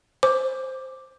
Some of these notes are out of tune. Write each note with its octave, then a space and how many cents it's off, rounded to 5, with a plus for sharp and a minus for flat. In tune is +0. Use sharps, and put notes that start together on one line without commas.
C5 +0 D6 +0